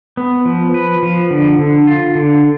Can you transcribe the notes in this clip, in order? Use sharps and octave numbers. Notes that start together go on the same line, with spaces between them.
B3
F3
B4
F3
D3
D3
F4
D3